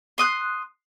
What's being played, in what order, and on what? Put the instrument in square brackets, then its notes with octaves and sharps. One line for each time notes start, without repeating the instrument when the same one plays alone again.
[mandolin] C6 D#6 F#6